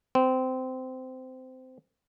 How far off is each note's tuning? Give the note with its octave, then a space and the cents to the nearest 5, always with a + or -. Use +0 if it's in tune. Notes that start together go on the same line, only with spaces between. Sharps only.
C4 -20